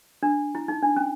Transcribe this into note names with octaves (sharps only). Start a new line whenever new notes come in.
D4
E4
D#4
D4
C#4